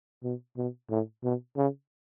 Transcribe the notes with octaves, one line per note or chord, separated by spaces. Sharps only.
B2
B2
A2
B2
C#3